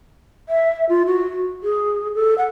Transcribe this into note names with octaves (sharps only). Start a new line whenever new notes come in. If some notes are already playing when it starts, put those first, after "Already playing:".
E5
F4
F#4
G#4
A4
F#5